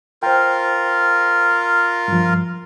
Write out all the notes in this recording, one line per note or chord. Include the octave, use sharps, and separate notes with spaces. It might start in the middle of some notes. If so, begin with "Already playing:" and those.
F4 A#4 C5 G5
G2 F3